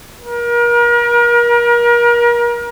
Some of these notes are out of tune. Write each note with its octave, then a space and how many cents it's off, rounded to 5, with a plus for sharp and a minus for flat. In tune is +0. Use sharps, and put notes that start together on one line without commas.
A#4 +35